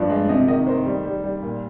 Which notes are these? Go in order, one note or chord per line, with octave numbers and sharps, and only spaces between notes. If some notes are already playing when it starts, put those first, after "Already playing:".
Already playing: G2 F3 D5
G#3
C3 D#5
D#3 D#5
D#3 C5
G3
G3
G3
A#2